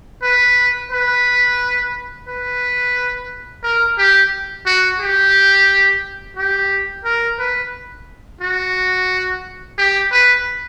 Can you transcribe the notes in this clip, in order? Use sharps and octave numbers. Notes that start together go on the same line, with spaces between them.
B4
B4
B4
A#4
G4
F#4
G4
G4
A#4
B4
F#4
G4
B4